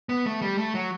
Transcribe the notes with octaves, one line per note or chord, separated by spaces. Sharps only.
B3
A3
G3
A3
F#3